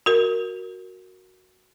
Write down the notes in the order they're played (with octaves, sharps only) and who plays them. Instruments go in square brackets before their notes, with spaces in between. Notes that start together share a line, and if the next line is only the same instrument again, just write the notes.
[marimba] F#4 A#4